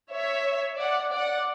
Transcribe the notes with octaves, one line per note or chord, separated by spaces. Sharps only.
C#5 E5
D5 F#5
D5 F#5